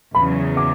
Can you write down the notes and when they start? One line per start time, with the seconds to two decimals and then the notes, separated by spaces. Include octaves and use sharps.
0.14 E2 C#3 F#3 B5
0.57 D6